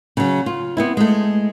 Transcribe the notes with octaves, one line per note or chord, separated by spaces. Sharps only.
C#3 F#3
F4
B3 C4 E4
G#3 A3